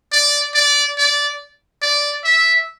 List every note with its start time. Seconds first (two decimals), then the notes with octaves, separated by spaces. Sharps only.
0.12 D5
0.55 D5
0.98 D5
1.82 D5
2.24 E5